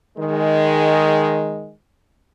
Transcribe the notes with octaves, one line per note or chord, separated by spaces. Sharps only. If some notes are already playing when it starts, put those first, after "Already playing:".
D#3 G#3